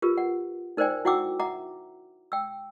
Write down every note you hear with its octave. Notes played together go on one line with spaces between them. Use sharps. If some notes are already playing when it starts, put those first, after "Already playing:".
F4 G4 A#4 B4
F#5
D#4 A#4 C5 D5 G5 G#5
E4 F#4 F#5 G5 D6 E6
E5 F#5 A#5 D6
G5 E6